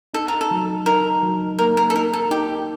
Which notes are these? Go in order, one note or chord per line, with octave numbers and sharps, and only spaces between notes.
D#4 A4
A#4
A4
F#3
D#4 A#4
F#3
A#3 A#4
A#4
A4
D#4 A#4
A4
D#4 G4